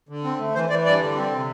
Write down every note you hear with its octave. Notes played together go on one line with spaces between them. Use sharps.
D3
C4
A3
E3 C5
E3 D5
G2 D5
D3
C4
C3